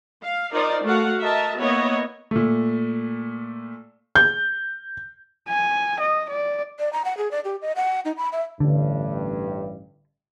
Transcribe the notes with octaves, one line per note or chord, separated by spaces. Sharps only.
F5
D#4 F4 A#4 C5 D5
A3 F#4 F5 F#5
F#4 A#4 D#5 E5 A5
A#3 B3 E4 C#5 D#5
A#2 A3
G6
G#5
D#5
D5
D5
A#5
F#5
G#4
D5
G4
D#5
F#5
D#4
B5
E5
A1 G2 D3